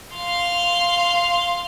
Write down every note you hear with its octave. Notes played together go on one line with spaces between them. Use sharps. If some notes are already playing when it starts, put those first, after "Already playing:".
F5 C6